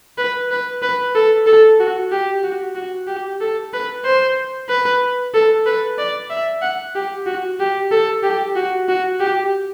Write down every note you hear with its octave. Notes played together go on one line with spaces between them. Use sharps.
B4
B4
B4
A4
A4
F#4
G4
F#4
F#4
G4
A4
B4
C5
B4
A4
B4
D5
E5
F#5
G4
F#4
G4
A4
G4
F#4
F#4
G4